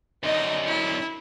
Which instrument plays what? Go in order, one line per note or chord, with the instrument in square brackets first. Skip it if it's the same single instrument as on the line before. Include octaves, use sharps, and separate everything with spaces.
[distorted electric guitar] F#2 D3 [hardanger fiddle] D#4 D#5
[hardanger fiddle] E4